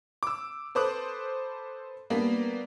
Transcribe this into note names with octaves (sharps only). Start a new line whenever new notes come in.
D6 E6
A4 B4 C5 D6 D#6 F#6
G3 A#3 B3 D4